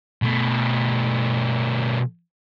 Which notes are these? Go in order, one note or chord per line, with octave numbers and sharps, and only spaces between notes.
B2 A3